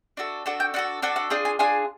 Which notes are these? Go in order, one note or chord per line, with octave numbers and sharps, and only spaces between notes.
D4 F#4 A4
D4 F#4 A4 A5
G5
D4 F#4 A4 F#5
D4 F#4 A4 F#5
F#5
D4 F4 G#4 G5
G#5
D4 F4 G#4 G#5